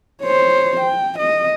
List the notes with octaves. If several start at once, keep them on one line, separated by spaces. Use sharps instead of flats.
C5 C#5
G5
D#5